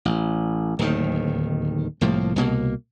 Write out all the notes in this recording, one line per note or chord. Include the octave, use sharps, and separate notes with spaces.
A1
D1 D#2 D#3
C2 A2 F3 A#3
C2 B2 A#3